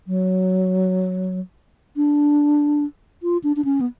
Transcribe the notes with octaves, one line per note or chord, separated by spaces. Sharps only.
F#3
D4
F4
D4
D4
C#4
B3